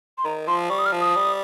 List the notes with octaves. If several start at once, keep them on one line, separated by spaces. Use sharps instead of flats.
C6
D#3 A#5
F3 C6
G3 C#6
D#6
F6
F3
D#6
G3